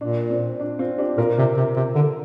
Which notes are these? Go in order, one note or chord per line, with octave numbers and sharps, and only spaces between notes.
A#2 D4
C4
D4
C4 F4
D4 G4
A#2 F4 A#4
C3
C3
C3
D3